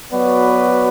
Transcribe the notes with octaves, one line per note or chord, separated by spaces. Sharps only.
F#3 B3 F#4 B4 D5